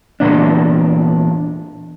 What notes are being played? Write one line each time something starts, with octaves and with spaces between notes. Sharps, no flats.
E2 A#2 D4